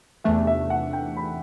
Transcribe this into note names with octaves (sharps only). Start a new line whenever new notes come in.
E2 C3 E3 A3 D4 E5
E5
F#5
G5
B5